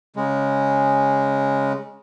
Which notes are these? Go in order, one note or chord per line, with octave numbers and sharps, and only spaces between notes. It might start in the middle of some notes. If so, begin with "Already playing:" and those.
C#3 G#3